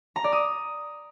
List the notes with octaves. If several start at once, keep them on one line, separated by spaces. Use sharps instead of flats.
A#5
D5
D#6